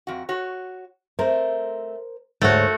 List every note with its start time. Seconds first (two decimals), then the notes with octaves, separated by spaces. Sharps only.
0.07 F2 F#4
0.29 F#4 C#5
1.19 A3 C4 A#4 C5
2.42 D2 G#2 A3 A#3 F#4 C#5